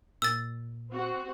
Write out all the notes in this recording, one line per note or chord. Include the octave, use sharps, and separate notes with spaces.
A#2 E6 A6
C4 F#4